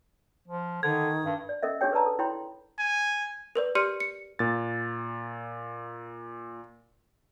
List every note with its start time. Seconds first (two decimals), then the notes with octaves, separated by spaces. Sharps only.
0.48 F3
0.83 D3 D#3 G#6
1.25 G2
1.49 D5
1.63 C#4 A4 A#4 D#5 E5
1.81 D4 G4 G#4 C#5 G5
1.92 A#4 B4 D5 A5 A#5
2.06 A4
2.19 E4 C#5 G5 B5 C6
2.79 G#5
3.55 A#4 B4 D5
3.75 G4 D5 C6 F6 C#7 D#7
4.00 C#7
4.39 A#2 A6